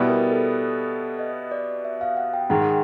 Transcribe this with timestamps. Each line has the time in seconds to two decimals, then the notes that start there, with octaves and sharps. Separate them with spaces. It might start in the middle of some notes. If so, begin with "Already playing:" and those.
Already playing: B2 G3 B3 E4
0.09 A#4
0.32 A4
1.19 D#5
1.52 D5
1.85 E5
2.01 F5
2.17 F#5
2.34 G5
2.50 G#2 D#3 G#3 F#5
2.62 F#5